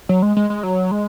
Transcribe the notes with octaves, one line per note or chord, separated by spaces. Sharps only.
F#3
G#3
G#3
G#3
F#3
G#3